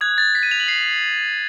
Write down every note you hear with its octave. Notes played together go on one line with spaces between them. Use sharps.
D#6 F#6 G#6
A6
B6
D#7
F7
F#7
C7